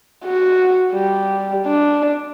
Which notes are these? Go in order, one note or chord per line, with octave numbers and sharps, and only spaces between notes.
F#4
G3
D4